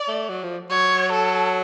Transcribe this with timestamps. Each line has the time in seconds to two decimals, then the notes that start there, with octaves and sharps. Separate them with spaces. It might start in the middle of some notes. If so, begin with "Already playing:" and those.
Already playing: D5
0.08 A3
0.29 F#3
0.43 F3
0.70 F#3 C#5
1.12 A4